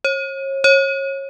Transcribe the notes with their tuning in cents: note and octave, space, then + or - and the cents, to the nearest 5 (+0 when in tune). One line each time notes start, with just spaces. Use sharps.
C#5 -35
C#5 -25